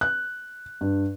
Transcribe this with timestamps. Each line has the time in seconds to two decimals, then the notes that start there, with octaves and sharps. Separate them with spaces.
0.01 F#6
0.81 G2